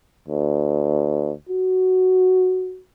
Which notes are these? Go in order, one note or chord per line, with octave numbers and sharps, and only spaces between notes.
D2
F#4